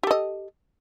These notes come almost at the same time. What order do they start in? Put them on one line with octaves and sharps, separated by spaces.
G4 A4 D#5